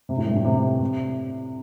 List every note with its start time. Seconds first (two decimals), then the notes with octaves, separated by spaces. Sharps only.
0.09 C3
0.17 A2
0.26 G2
0.36 A2
0.45 C3
0.81 C3